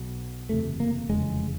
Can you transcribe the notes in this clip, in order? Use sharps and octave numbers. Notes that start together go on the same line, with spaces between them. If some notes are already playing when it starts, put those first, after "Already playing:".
Already playing: B1 B2
F#1 E2 C3 A3
A#3
F1 E2 C#3 G#3